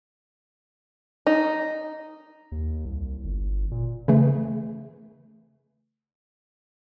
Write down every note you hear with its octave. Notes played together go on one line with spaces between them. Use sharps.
D#4
D#2
C2
G1
A#2
C#3 E3 A3